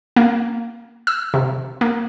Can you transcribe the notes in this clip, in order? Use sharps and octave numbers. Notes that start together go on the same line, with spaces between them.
A#3
E6
C3
A#3